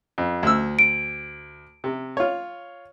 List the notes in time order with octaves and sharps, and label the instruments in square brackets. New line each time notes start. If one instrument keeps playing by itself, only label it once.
[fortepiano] F2
D2 E6
[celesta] D7
[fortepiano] C3
F4 C#5